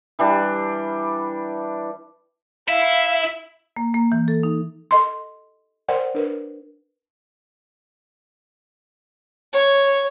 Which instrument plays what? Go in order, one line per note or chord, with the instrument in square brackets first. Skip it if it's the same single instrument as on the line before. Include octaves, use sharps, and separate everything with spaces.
[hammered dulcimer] E3 G3 D4
[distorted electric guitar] E4 [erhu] E5 [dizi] F5
[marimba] A#3
A#3
E3
A4
D#4
[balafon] A4 D#5 C6
A#4 C5 D5 F#5 G5 C6
D4 A#4 B4
[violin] C#5